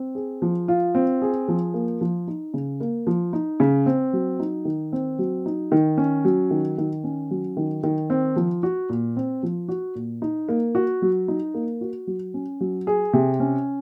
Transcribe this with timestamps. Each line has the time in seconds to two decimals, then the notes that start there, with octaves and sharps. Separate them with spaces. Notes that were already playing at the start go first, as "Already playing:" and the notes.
Already playing: C4
0.15 G#4
0.42 F3
0.68 F4
0.95 C4
1.22 G#4
1.48 F3
1.74 A#3
2.01 F3
2.28 D#4
2.54 C#3
2.80 A#3
3.07 F3
3.33 D#4
3.60 C#3
3.86 C4
4.13 F#3
4.40 D#4
4.65 D#3
4.92 C4
5.19 F#3
5.46 D#4
5.72 D#3
5.97 C#4
6.25 F#3
6.51 D#3
6.78 D#3
7.04 C#4
7.31 F#3
7.57 D#3
7.83 D#3
8.10 C4
8.36 F3
8.63 F#4
8.90 A#2
9.16 C4
9.43 F3
9.68 F#4
9.95 A#2
10.22 D#4
10.49 A#3
10.75 F#4
11.02 F#3
11.28 D#4
11.54 A#3
11.81 F#4
12.07 F#3
12.34 C#4
12.61 F#3
12.87 G#4
13.13 C3
13.40 C#4